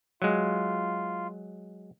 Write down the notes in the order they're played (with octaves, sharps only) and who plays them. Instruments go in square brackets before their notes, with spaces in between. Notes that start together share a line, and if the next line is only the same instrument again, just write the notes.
[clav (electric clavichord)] F#3 G#3 [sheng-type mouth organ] F4